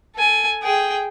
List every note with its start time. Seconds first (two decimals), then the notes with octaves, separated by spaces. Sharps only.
0.15 A4 G#5
0.63 G#4 G5